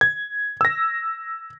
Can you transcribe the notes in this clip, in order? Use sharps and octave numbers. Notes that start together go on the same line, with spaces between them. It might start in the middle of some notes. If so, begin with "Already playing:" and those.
G#6
E6 A#6